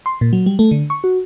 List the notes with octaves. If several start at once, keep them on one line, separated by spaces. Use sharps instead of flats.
C6
A#2
F#3
G3
A3
D3
C#6
F#4